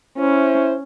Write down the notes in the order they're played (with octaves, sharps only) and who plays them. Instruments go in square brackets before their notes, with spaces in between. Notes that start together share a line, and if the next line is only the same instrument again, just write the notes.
[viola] C#4 [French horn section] E4 C5